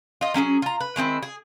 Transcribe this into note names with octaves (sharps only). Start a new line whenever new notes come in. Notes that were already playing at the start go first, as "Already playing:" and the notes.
F4 D#5
F#3 C#4 G4 G#4
F4 A#5
B4
D#3 G#3 C4 E4
G#4